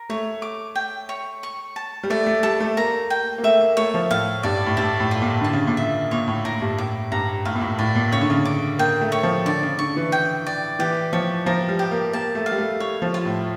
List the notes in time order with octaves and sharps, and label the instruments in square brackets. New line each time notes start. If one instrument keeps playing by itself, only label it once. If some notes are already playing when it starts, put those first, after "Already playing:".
Already playing: [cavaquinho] A#4
[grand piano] A3 [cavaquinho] C#5
[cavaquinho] D6
G5
C#5
C#6
A5
[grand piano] G3
[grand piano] A3 [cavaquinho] D5
[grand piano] A3
[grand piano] G3 [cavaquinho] A4
[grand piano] A3
[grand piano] A#3 [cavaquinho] A#5
[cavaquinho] G5
[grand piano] A#3
[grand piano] A3 [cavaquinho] E5
[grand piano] A#3
[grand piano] A3 [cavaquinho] C#5
[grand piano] F3
[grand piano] A2 [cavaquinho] F5
[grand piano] G2 [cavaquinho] D5
[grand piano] A2
[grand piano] G2 [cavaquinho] A4
[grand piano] A2
[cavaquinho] F4
[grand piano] A#2
[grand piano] D3 [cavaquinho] A5
[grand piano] C#3
A#2
[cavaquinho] E5
[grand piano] A#2 [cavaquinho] C#5
[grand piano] A2
[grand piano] A2 [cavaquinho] A#4
[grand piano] G2
[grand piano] A2 [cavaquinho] D6
[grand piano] G2 [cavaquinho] A#5
[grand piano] A2 [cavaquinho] F5
[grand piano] A#2
A2
[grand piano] A2 [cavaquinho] D5
[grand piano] A#2
[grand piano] C#3 [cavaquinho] C#5
[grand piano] D3
C#3
[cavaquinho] D6
[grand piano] A#3 [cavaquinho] G5
[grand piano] A3
[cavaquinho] C#5
[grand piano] F3
[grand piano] D3 [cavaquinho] D5
[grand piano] C#3
[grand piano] D3 [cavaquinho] C#6
[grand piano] E3
[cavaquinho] G5
D5
[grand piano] E3 [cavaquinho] G4
[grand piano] F3 [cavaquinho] C#5
[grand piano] F3 [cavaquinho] A#4
[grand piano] G3
[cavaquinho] G4
[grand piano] A#3
[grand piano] A#3 [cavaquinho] A5
[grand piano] A3
[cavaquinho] F5
[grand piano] G3
A3
[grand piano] G3 [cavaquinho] C#5
[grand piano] F3
[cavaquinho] F4
[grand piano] A2